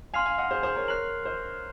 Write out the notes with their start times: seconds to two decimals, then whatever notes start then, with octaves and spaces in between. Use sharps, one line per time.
0.14 F5 G#5 C6 F6 C7 F7
0.26 F5 G#5
0.38 D#5 F#5
0.51 G#4 C5
0.63 G#4 C5
0.75 A#4 C#5
0.88 A#4 C#5 F#6 C7 F#7
1.25 C5 D#5